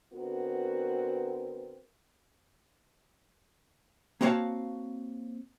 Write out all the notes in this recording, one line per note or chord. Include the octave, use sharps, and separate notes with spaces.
D3 B3 C4 F#4 A#4
A#3 C4 F#4 C#5 F5 A5